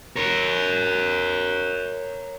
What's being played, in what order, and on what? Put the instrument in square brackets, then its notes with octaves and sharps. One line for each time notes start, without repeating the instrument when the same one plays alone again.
[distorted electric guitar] A#4 C#5